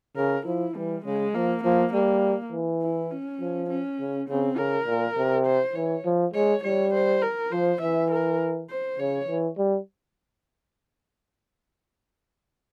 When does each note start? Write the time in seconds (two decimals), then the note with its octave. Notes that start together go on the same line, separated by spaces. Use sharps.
0.16 C#3 A#4
0.46 F3 E4
0.75 E3 G3
1.05 C#3 G#3
1.35 F3 A#3
1.64 F3 A#3
1.93 G3 A#3
2.52 E3
2.82 E4
3.11 C#4
3.40 F3
3.69 C#4
4.00 C#3
4.29 C#3 C4
4.58 C#3 A#4
4.87 A#2
5.17 C3
5.47 C5
5.75 E3 C#5
6.05 F3
6.34 G#3 C#5
6.64 G3 C#5
6.94 C5
7.22 A#4
7.51 F3 C5
7.81 E3 E5
8.11 A#4
8.70 C5
8.99 C#3 C#5
9.28 E3
9.58 G3